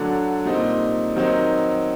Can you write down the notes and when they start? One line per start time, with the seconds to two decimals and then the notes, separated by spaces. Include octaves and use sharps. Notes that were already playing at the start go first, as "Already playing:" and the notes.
Already playing: D3 F#3 A3 D4
0.45 A#2 G3 C4 D#4
1.16 D#3 F#3 C4 D#4